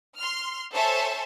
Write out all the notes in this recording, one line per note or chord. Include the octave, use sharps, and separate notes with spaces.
C6 F6
A4 C5 C#5 E5 G#5 A5